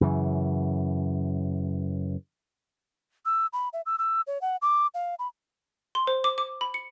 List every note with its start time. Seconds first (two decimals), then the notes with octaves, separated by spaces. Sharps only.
0.01 F#2 C#3 E3
3.26 E6
3.53 B5
3.73 E5
3.86 E6
3.99 E6
4.27 C#5
4.41 F#5
4.62 D6
4.94 F5
5.19 B5
5.95 C6
6.07 C5
6.24 D6
6.38 D6
6.61 B5
6.74 C#7